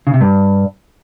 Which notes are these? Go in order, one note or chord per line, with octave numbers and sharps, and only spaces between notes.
C#3
C3
G2